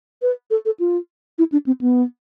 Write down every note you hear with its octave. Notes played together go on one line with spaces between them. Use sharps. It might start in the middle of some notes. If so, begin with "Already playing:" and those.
B4
A4
A4
F4
E4
D4
C4
B3